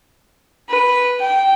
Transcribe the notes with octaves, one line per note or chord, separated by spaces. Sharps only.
B4
G5